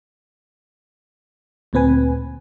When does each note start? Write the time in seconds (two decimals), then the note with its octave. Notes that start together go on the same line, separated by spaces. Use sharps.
1.73 D2 A#2 C4 B4 G#5